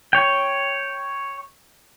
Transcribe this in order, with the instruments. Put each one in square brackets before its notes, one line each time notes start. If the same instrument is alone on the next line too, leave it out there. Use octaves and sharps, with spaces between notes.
[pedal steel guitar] C#5 G5